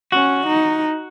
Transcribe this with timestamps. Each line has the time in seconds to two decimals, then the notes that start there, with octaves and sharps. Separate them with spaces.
0.12 C#4 F#4
0.47 D#4